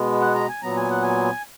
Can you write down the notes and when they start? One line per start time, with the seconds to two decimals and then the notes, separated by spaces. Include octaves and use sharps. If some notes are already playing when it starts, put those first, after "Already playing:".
Already playing: B2 G#3 B3
0.21 F#5
0.35 A#5
0.49 G#5
0.63 A#2 F#3 B3 A#5
0.76 G#5
0.90 F#5
1.03 G#5